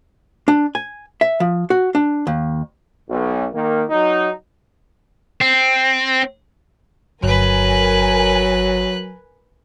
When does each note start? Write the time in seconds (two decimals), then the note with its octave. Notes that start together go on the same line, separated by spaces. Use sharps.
0.48 D4
0.75 G#5
1.21 E5
1.40 F3
1.70 F#4
1.95 D4
2.27 D#2
3.09 B1
3.54 D#3 A#3
3.90 F#3 D#4
5.41 C4
7.23 G1 F#3 A#4 B4 G#5 F#6